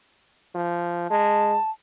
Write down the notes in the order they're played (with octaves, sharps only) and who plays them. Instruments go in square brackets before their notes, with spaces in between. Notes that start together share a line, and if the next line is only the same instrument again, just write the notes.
[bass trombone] F3
[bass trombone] G#3 [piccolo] A5